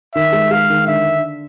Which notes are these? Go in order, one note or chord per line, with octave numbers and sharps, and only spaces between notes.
D#3 E5
G#3
G#3 F5
D#3
D3 E5
D3